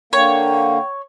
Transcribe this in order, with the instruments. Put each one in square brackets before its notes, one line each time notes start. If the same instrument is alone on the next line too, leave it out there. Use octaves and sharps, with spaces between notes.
[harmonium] D3 A#3 [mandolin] C#5 [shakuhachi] G5